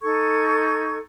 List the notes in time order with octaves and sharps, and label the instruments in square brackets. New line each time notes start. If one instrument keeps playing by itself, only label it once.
[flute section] D#4 A4 C#6 G#6